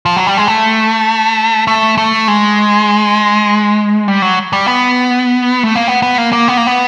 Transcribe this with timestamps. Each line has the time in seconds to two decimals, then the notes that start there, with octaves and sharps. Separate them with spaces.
0.06 F3
0.16 F#3
0.26 G3
0.37 G#3
0.48 A3
1.67 A3
1.98 A3
2.28 G#3
4.08 G3
4.22 F#3
4.53 G3
4.67 B3
5.63 A3
5.75 A#3
5.88 B3
6.02 B3
6.18 A#3
6.33 A#3
6.48 B3
6.57 A#3
6.67 B3